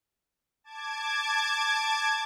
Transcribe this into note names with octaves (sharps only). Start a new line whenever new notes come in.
A5 D6 G#6